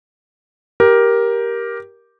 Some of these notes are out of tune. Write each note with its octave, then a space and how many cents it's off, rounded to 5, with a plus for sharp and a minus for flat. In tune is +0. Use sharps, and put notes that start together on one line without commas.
G4 +0 A#4 +10